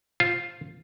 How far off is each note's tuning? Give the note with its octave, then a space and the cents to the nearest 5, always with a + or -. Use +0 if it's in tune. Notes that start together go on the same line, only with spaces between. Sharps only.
F4 +0 C5 +5